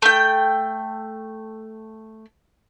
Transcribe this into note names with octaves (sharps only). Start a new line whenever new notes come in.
A3 G5